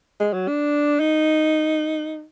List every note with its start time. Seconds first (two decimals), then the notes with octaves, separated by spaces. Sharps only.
0.20 G#3
0.33 F#3
0.48 D4
1.00 D#4